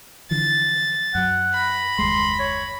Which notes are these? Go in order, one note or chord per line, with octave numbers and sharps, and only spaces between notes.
D3 E3 F3 A6
F#2 F#3 F#5
B5 A#6
F#1 D#2 G#3 C6
C#5